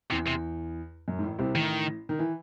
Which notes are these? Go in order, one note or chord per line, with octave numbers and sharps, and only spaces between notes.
E2 C3
C3
F#2
G#2
A1 A2
C2 C3
A1 A2 D#3
D#3
E3